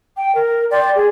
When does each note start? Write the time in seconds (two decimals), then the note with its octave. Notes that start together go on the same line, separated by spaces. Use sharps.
0.18 G5
0.34 A#4
0.70 D5 G5 C6 D6
0.95 G#4